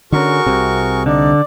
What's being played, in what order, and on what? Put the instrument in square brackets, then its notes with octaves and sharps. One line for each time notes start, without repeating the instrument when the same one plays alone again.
[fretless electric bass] D3 C#4 [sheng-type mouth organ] F#4 A#4 C#6 [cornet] G#4
[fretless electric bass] C2 C3
[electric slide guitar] D3 [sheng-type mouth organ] D#4 [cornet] D5